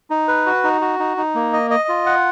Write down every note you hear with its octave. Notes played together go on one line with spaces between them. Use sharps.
D#4
B4
F#4
D#4
F#4
D#4
D#4
A#3
D#5
D#5
F4
F#5